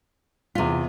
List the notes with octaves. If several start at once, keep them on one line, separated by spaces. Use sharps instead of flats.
E2 C3 F4 B6